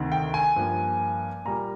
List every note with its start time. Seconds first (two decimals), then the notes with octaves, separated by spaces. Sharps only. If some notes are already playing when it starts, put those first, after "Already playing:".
Already playing: D2 C3 D#3
0.12 G5
0.34 G#5
0.56 G2 F3 A#3
1.45 A#2 G3 A#3 A#5